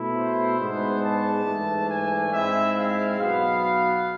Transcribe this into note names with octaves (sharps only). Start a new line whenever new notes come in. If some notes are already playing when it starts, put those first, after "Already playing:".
Already playing: B2 A3 E4
C5
G#2 G#3 B3 D4
A5
G#2 E3 A3 D4
G#5
G#2 G#3 C4 E4 E5
F5
B1 B2 B3 F5